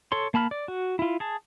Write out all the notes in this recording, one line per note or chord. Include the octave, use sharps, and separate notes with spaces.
A4 C#5 C6
A#3 A5 B5 F6
D5
F#4
E4 F4
G#4 A5